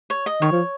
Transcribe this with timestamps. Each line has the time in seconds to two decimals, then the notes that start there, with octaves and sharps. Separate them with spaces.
0.10 C#5
0.26 D#5
0.41 D#3 C#5
0.52 F3